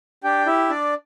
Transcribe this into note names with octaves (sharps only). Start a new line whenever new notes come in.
D4 G4 G5
E4 G4 E5
D4 D5